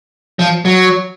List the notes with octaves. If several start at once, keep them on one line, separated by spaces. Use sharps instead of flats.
F3
F#3